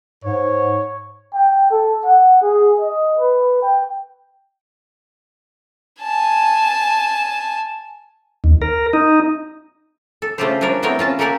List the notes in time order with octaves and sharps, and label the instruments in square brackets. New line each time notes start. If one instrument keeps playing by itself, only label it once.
[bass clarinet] G#2 [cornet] C#5
[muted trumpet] G5
A4
F#5
G#4
D#5
B4
G5
[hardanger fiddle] G#5 A5
[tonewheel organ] D#2
A#4
D#4
[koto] A4
C#3 A3 D4 F4 G4 C5
F3 G3 D4 A#4 C#5
E3 A3 B3 C4 A#4 C#5
C#4 F4 A5
A#3 G4 A4 A#4 F#5 G#5